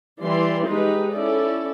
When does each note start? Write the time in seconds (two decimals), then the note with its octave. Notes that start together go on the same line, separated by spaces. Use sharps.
0.22 E3 G3 D5 C6
0.68 G#3 D#4 G4 B4
1.13 C#4 E4 A4 D5